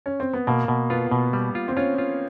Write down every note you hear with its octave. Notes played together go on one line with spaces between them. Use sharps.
C#4
C4
B3
B2 A#3
B2
B3 F4
B2
G3
F4
C4
C#4 F4
F4